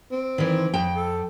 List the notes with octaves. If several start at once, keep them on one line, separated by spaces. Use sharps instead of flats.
C4
D#3 E3
F2 G5
A4